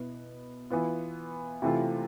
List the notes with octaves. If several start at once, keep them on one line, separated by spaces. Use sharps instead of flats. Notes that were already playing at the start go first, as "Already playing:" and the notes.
Already playing: B2 B3 E4 B4
E3 B3 F4
C3 E3 A3 C4 F4